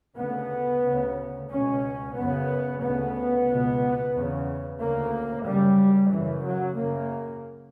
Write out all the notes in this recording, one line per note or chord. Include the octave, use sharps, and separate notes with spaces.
D2 C#3 B3
D2 C#3
C#2 B2 C#4
F#2 C#3 B3
D2 C#3 B3
C#2 B2
E2 C#3
D2 C#3 A#3
F#2 C#3 G3
F#2 C#3 E3
F#3
F#2 C#3 A#3